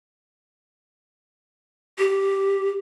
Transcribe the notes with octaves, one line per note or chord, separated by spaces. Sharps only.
G4